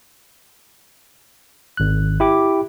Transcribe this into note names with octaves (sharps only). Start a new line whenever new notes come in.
G#1 F#6
E4 G4 D6